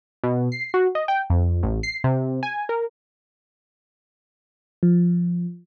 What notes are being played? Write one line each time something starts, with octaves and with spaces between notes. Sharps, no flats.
B2
C7
F#4
D#5
G5
F2
A1
C7
C3
G#5
A#4
F3